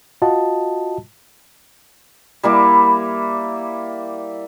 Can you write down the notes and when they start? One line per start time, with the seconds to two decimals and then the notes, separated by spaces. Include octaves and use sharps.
0.22 F4 F#4 D#5 A5
2.43 G3 A#3 E4